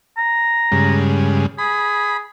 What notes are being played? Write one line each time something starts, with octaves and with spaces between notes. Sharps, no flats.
A#5
G2 C#3 G#3
G#4 B5